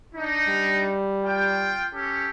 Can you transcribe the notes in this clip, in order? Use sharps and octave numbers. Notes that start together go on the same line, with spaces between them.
D4 D#4
G3
F4 G5
C#4 G4 A4